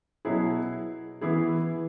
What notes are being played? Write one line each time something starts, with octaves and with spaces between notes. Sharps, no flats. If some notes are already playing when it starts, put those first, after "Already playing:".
B2 F#3 E4 G#4
E3 B3 E4 G#4